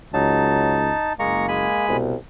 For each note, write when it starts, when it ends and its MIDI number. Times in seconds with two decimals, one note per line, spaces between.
0.14 0.92 37
0.14 0.79 54
0.14 1.13 63
0.14 1.13 81
1.19 1.66 30
1.19 1.46 56
1.19 1.83 58
1.19 1.46 82
1.19 1.46 85
1.48 1.97 56
1.48 1.97 80
1.48 1.97 83
1.88 2.15 36
1.88 2.15 47